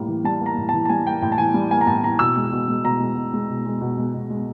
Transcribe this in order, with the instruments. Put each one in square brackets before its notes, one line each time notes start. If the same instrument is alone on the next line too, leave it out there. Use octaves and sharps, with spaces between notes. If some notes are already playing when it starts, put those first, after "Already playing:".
Already playing: [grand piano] A2 G3 A#3
E3
G3 A5
A#3 A#5
A2
E3 A5
A5
G3 G#5
A#3 G5
A2 G5
A5
E3 G#5
G3
A#3 G#5
A#5
A2 A5
E3 A#5
B2 E6
G#3
B2
G#3
B2 A#5
G#3
B2
G#3
B2
G#3
B2
G#3
B2
G#3